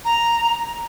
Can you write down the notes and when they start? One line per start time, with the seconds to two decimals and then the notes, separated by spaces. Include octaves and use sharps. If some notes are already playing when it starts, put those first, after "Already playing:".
0.05 A#5